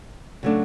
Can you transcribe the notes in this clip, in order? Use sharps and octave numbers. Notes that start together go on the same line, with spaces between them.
C#3 F#3 A3 D4